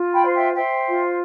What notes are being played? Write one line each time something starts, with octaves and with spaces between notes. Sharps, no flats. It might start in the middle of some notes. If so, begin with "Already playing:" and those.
Already playing: F4
G5 B5
C5
E5 G5
C5 E5 G5
F4